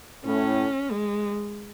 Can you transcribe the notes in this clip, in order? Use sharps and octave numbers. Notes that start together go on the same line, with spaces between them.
A2 C#4
G#3